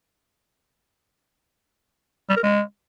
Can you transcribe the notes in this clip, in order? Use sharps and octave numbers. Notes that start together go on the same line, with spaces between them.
G3
A#4
G#3